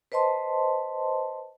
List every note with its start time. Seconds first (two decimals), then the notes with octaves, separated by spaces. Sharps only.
0.12 B4 C5 D#5 A5 C6